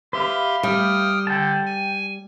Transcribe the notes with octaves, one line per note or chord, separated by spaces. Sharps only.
G4 B4 E5 F5 C6
G3 G5 D#6 F6
D3 G5 A5
G#5